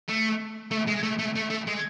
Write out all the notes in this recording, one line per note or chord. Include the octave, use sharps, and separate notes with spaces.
A3
A3
G#3
A3
A3
A3
A3
G#3